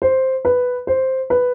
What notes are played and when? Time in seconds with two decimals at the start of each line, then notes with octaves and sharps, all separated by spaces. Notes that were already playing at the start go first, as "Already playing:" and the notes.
0.02 C5
0.45 B4
0.87 C5
1.30 B4